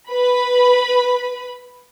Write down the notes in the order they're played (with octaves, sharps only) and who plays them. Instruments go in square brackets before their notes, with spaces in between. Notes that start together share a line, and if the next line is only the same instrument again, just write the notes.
[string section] B4 B5